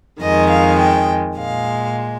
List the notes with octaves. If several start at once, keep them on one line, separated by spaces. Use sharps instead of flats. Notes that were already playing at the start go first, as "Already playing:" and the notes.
F2 D#3 G#3 D#5
F5
G5
A#2 G#3 F5